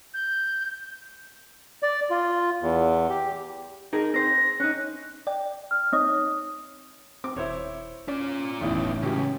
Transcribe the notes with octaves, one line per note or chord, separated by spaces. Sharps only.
G6
D5
F4
E2
G4
D#4 G#4 A#4
C4 C5 A#6
C#4 D#4 F#6
D5 G5
F6
C4 D#4 C#5 D#6
C4 D6
D#1 E4 C5 C#5
C#4 F4 D5
E1 A1 E3 B3 D#4
C#2 F#3 C#4 G4